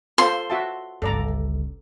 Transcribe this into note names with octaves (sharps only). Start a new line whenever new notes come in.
F4 A4 C5 C6
F#4 E5 A5
G1 C#2 A4 D5 A#5